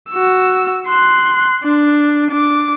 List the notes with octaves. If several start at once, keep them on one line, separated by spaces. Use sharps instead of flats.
F#4 E6
C6 F#6
D4
D4 D6